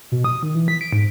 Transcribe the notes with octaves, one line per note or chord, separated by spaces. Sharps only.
B2
D#6
D#3
E3
B6
D7
G#2